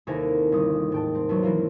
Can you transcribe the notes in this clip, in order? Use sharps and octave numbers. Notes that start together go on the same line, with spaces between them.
D#2 C3 E4 A4 A#4 G#5
G1 D#6
G#2 G5 A5
C4
E2 F#3
E3 A#3 E4 F4